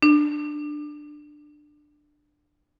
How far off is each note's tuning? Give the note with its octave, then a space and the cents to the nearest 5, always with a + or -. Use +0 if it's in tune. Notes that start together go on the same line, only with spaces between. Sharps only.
D4 +15